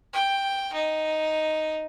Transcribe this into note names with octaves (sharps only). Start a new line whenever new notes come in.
G5
D#4